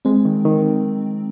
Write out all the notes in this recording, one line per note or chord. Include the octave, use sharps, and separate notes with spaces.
G#3 C4
D#3
D#3